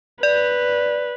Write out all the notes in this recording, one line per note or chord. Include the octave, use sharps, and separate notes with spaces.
B4 D5